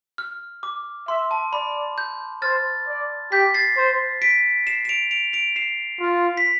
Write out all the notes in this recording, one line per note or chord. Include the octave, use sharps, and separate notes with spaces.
F6
D6
E5 C6
A5
D5 B5
G6
C5 F6 A6
D5
G4 G6 B6
A6 C7
C5
B6 D7
C7 E7
E7
D7 F7
D7 F7
D7 F7
C7 E7
F4
B6